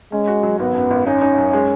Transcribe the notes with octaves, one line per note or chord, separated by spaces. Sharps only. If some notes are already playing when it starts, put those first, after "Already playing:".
G#3 C#4
F#4
F#3
G#1 B3
F#2
G#1
C#4 D#4
D#4
F#2
G#3